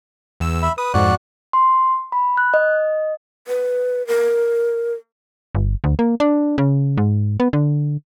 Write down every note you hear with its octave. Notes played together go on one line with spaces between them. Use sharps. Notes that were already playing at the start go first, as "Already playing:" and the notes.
E2 E6
E5 B5
B4 D#6
F2 G#2 F#4 D5 F#6
C6
B5
F#6
D#5
B4
A#4
G1
D2
A#3
D4
C#3
G#2
B3
D3